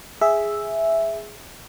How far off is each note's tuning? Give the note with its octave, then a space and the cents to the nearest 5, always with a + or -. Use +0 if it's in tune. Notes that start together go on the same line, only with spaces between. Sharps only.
G#4 +0 E5 +0